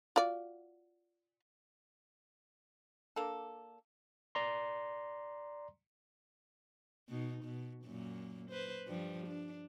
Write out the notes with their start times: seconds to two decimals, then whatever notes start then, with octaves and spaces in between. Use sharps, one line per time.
0.16 F4 F#4 D5
3.16 A#3 D4 A4
4.35 D5 A#5 C6
7.09 B2 D#4
7.44 B2
7.84 F#2 A#2 A#3
8.50 B4 C5
8.87 G2 F3 G3
9.27 D4